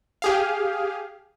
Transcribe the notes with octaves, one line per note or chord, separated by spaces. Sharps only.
G4 G#4 F5